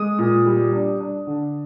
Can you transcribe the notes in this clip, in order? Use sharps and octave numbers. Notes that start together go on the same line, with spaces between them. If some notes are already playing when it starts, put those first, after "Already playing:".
Already playing: G#3 D#6
A#2
G3
D4
D4
D3